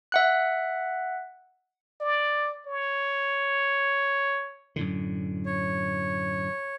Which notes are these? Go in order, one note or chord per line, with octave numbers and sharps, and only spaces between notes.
E5 F#5 F#6
D5
C#5
F#2 A2 D3
C#5